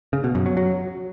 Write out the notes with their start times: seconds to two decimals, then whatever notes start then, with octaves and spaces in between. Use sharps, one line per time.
0.13 C#3
0.24 B2
0.35 F#2
0.46 F#3
0.57 F#3